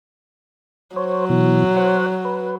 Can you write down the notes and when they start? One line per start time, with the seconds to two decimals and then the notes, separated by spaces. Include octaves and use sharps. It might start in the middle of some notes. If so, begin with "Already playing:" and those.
0.96 F#3 C5 C#5
1.29 B2 E3
1.76 C5 C#5 F#5
2.25 B4